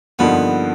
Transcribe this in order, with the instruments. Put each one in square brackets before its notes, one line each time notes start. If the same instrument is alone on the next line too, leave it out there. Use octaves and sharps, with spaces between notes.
[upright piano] G2 D3 F3 A#3 D#4 [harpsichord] B3